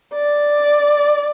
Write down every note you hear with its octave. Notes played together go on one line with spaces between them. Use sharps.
D5